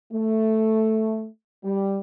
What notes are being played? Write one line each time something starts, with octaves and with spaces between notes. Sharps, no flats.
A3
G3